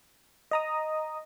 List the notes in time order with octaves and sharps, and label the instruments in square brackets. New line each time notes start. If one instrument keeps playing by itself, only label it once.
[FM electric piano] D#5 A#5 D#6